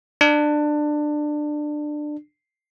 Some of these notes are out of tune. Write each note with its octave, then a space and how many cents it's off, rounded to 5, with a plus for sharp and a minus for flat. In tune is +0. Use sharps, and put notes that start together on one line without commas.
D4 +20